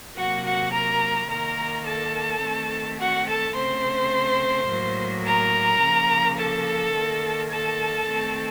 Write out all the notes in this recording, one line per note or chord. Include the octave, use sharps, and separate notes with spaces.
C3 F#3 A#3 F#4 F#5
F#4 F#5
A#4 A#5
D#3 A#3 A#4 A#5
A4 A5
D#3 A3 C4
F#4 F#5
A4 A5
C#3 A3 C4 C5 C6
A2 F#3 A#3
A#4 A#5
C#3 F3 A#3
A4 A5
D#3 A#3
A4 A5
D#3 A3 C4